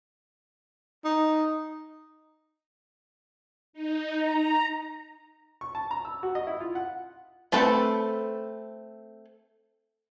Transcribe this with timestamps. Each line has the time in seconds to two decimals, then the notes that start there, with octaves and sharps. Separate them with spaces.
1.05 D#4
3.73 D#4
4.11 A#5
5.61 C#6
5.75 A5
5.91 A#5
6.05 E6
6.23 F#4
6.35 D#5
6.47 E4
6.60 F4
6.75 F#5
7.52 A3 C4 A4 B4